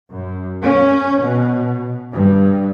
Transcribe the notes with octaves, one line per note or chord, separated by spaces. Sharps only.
F#2
C#4
B2
G2